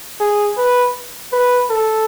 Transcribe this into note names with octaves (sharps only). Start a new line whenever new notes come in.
G#4
B4
B4
A4